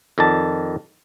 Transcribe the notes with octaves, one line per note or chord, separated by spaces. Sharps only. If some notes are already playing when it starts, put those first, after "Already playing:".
F2 D#3 D5 A5